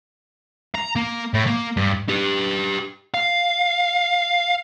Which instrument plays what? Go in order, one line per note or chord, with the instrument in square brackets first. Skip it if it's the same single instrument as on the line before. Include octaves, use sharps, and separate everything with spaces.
[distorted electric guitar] A#5
A#3
A2
A#3
G2
[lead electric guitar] G4 B4
F5